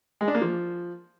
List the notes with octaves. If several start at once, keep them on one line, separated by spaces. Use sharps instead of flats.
G#3
D4
A#3
F3